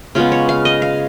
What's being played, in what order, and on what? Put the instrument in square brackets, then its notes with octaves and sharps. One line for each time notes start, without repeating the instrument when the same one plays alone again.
[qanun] C#3 G#3 B3 F4
C#5
F5
D#5
F5